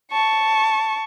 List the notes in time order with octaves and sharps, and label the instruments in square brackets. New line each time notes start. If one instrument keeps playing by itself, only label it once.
[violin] A5 C#6